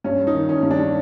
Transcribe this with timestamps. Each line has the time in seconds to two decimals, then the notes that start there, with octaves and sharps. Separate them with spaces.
0.04 G2 C#4
0.27 D#4
0.34 D#3
0.49 C#4
0.63 G2
0.71 D4